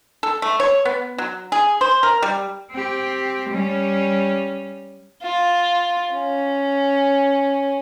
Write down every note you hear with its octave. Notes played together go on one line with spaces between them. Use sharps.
A4
A3
C#5
B3
F#3
G#4
C5
A#4
G3
C4 G4
G3 C#4
F4
C#4